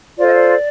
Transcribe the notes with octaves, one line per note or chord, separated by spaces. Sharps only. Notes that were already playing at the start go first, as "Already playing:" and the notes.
F4 A4 C5 D5
D#5
D5